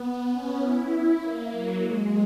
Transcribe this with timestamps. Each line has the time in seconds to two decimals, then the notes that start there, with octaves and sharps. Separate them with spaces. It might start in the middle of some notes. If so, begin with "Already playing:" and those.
Already playing: B3
0.32 C#4
0.61 E4
1.20 A#3
1.51 F#3
1.80 G#3